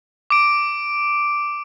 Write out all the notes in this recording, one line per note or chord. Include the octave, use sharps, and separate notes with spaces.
D6 D7